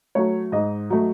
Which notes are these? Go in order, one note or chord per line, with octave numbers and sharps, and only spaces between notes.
F#3 A3 C#5
G#2 D#5
F#3 A3